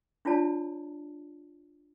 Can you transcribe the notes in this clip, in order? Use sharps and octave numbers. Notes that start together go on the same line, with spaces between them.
D4 E4 F4 C#5 D5 A5